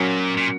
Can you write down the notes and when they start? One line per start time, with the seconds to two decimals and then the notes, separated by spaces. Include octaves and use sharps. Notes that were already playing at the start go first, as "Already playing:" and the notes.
Already playing: A#2 F#3 A#3 C#4 F#4
0.37 A#2